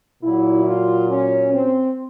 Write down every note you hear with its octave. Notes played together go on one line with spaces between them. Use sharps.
A#2 F#3 E4
F4
C#4
C4